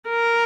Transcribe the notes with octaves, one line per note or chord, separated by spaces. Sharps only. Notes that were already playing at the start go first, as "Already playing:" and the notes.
A#4